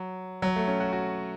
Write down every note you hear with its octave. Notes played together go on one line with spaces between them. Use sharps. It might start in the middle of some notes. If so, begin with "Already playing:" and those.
Already playing: F#3
F#3
A3
C#4
F#4
F#4